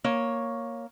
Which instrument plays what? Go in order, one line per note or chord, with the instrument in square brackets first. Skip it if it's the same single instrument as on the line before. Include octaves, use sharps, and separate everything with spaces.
[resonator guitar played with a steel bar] A#3 C#5